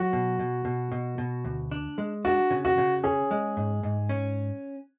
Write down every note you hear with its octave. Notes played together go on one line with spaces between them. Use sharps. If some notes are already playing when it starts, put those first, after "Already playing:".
Already playing: F#3 F#4
B2
B2
B2
B2
B2
D2
D4
G#3
D4 F#4
C#3
F#4
C#3
C#4 G#4
G#3
G#2
G#2
C#4